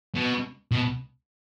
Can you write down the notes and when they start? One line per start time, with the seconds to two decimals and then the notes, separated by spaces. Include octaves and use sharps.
0.15 B2
0.72 B2